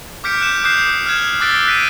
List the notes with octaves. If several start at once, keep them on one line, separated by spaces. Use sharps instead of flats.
D6 F6 G6 B6 C#7 D7
F#6 G6 E7
D6 D#6 F#6 G6 C7 E7
F6 F#6 G#6 E7
D6 E6 F#6 A6 B6 D7
F#6 B6 D7 D#7